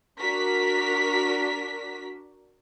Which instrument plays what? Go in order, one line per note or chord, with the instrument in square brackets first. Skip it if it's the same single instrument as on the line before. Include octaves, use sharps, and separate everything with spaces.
[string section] D4 F#4 A#4 B6